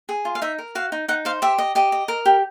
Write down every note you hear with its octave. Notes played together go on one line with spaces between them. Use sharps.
G#4
F4
F5
D#4 E5
A#4
F#4 F5
D#4
D#4 F#5
C5 F5
G4 E5
D#5
G4 D#5
D#5
A#4
G4